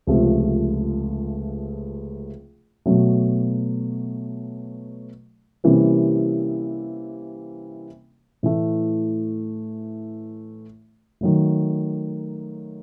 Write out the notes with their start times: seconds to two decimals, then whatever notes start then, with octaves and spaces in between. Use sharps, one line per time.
0.07 C#2 C3 F3 A3
2.86 B2 F#3 A3
5.64 C3 E3 G3 A#3 C#4
8.43 A2 E3 A3
11.21 D#3 F#3 A3